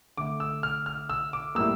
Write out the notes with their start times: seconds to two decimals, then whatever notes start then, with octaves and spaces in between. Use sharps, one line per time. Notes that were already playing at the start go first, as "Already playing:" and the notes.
0.17 D3 A3 D6
0.40 E6
0.63 F6
0.86 F6
1.10 E6
1.33 D6
1.55 A2 G3 A#3 E6